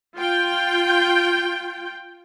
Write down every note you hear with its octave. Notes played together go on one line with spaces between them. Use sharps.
F4 G5